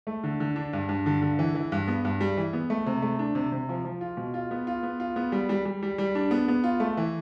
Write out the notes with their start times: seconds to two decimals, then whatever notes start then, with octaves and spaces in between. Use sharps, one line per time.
0.07 A3
0.24 D3
0.40 D3
0.56 D4
0.73 G2
0.89 G2
1.06 D3
1.22 D3
1.39 E3
1.55 E3
1.72 G2
1.88 B3
2.05 G2
2.21 G3
2.37 E3
2.53 B3
2.70 A3
2.86 C3
3.02 A3
3.19 D4
3.35 C3
3.52 C3
3.69 F3
3.85 F3
4.01 F4
4.17 B2
4.34 F4
4.51 B3
4.67 F4
4.83 B3
5.00 F4
5.16 B3
5.32 G3
5.49 G3
5.65 G3
5.83 G3
5.98 G3
6.15 D4
6.31 B3
6.48 B3
6.64 F4
6.80 A3
6.97 E3